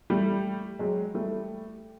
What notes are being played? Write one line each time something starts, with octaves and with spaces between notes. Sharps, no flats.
G3 A3
F#3 G#3
G3 A3